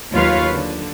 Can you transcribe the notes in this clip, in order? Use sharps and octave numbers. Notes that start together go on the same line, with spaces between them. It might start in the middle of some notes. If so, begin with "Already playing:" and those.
D#2 F#3 F4 B4 C#5 F5
D3